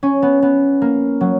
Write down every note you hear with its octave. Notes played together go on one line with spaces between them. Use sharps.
C#4
B3
B3
A#3
F#3